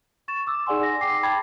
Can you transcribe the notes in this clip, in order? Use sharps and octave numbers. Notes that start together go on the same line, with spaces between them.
C#6 A6 E7
D6 E6
D#4 G#4 D5 F#5 G#5 C6
A#6
G5 D6 C7
G5 A5 B5 D6 G#6 A6